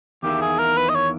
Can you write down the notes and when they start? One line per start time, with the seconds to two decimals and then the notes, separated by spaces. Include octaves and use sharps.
0.23 E2 D#3 A#3 E4 G4
0.41 G#4
0.59 A#4
0.77 B4
0.89 D#5
0.95 C#5